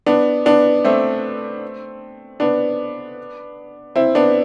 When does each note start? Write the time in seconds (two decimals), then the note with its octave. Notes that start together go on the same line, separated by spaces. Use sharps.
0.06 B3 D4
0.46 B3 D4
0.85 A3 C4
2.40 B3 D4
3.96 C4 E4
4.15 B3 D4